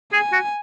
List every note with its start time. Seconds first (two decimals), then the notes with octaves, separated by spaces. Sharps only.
0.13 G#4 G#5
0.32 F#4